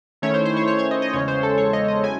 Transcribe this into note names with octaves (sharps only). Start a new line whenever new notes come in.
D#3 A3 C#4 E4 C#5
C5
C5
C#5
C#5
C#5
D#5
D#5
E2 C#3 G#3 C#4 C#5
C5
A4
C#5
D#5
D#5
F#3 C#4 E4 G#5